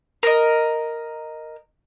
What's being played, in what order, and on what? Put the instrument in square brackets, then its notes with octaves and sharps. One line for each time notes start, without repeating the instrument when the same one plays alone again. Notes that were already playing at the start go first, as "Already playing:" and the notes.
[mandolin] A#4 D#5